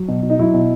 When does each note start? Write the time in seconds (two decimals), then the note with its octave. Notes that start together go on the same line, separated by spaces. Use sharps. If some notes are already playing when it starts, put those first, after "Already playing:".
Already playing: F#3
0.08 B2
0.23 B2
0.30 D#4
0.39 F#3 E4
0.54 B2